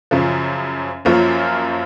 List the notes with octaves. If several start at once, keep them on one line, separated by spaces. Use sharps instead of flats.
F#2 C#3 F3
F#2 F3 A#3 C#4 F4